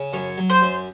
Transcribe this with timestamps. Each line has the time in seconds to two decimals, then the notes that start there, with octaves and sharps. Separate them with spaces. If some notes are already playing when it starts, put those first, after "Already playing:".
Already playing: C#3
0.13 F#2 C#5
0.38 F#3
0.50 C5
0.62 F#2